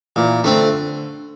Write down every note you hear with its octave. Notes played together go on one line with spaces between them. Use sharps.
A#2 E3
D3 A3 C4